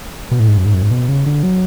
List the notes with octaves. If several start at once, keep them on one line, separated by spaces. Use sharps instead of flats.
B2
A2
G#2
F#2
G#2
F#2
G#2
B2
C#3
D3
F#3